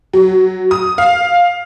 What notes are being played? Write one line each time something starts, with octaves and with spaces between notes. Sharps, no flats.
F#3
D#6
F5